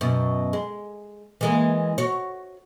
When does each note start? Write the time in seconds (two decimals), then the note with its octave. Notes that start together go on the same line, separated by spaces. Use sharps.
0.01 F#2 B2
0.53 G#3
1.41 E3 G#3 A#3
1.98 F#4 C#5